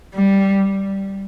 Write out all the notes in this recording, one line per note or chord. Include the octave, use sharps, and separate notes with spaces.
G3